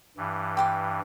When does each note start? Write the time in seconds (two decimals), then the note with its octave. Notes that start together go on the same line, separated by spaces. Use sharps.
0.17 G2 E3
0.57 G5 C6 D6